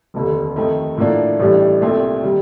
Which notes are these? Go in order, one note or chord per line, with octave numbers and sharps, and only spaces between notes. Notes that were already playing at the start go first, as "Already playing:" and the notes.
F1 D#2 D3
F2 D#3 A3 D#4
A2 F3 A#3 D4
A1 A2 G3 D4
C2 A#2 A3 C4
D#3 G3